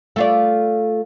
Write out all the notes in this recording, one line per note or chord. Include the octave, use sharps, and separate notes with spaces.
A3 F4 D5